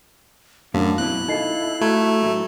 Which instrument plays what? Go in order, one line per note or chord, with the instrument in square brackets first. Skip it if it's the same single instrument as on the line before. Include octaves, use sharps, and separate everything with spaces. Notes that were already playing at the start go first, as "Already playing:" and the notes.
[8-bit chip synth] F#2 [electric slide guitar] A2 F#4 [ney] D4 [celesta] F5 A5
[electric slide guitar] B2 F#3 C4 [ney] E4 [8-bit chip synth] F#6
[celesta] D#4 D#5 C7 [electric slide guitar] F4 A4
[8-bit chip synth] A3 [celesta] F#4 A#5 G#6
[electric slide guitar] A2 F#3